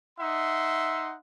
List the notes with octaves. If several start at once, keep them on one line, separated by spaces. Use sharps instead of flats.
D#4 E5 F#5 C6